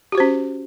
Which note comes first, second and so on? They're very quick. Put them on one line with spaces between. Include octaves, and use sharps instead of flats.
G4 F#4 C5 C#4